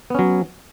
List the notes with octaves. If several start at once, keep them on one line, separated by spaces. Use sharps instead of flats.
F#3 B3 C#4